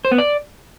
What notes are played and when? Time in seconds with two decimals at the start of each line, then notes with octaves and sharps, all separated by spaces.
0.05 C5
0.11 B3
0.18 D5